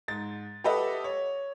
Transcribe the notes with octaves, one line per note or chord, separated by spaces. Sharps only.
G#2 A6
G4 A4 B4 D#5 E5 F#5
C#5